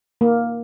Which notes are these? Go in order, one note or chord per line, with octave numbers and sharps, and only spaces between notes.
A#3